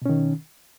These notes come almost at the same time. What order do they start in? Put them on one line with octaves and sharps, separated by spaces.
B2 C#4 D#3